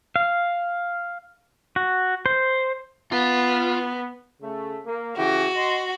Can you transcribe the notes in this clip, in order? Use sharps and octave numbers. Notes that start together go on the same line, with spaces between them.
F5
F#4
C5
B3 F4
C#3 A3
A#3
C#3 E3 F#4 G4
D#5 C6